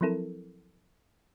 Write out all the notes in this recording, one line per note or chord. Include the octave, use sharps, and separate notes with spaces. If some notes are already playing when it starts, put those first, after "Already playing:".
F3 F#3 C4 E4 A4 A#4